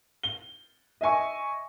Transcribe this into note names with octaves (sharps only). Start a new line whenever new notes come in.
G7
D#5 E5 G#5 C#6